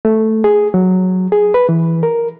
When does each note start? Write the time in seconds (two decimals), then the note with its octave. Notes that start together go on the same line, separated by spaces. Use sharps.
0.05 A3
0.44 G#4
0.74 F#3
1.32 G#4
1.54 B4
1.69 E3
2.03 A#4